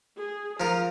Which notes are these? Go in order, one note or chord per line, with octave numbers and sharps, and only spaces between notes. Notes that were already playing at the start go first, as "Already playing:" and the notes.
G#4
F3 A#4 A#5